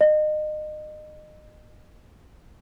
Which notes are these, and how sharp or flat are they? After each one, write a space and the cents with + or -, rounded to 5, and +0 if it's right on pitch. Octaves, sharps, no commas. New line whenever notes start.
D#5 -30